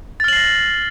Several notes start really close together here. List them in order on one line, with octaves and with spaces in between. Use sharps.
A6 F6 F#7 C7 A#6